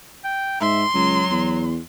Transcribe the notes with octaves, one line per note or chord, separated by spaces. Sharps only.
G5
G#2 E5 C6
C#2 F#3
E2